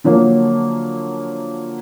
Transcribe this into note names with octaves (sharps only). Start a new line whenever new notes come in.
D3 F3 F#3 A#3